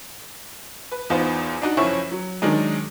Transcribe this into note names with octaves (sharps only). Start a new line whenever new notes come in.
B4
E2 B3 D#4 F4 C5
D4 D#4 F#4
F#1 F3 C#4 E4 C#6 E7
F#3
D#3 F#3 G#3 D4 D#4